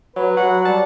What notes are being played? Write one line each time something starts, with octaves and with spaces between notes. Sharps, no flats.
F#3 B4
F#3 F#5
G3 A5